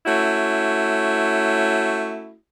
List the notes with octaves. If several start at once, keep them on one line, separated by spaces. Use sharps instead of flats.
A3 C#4 E4 F#4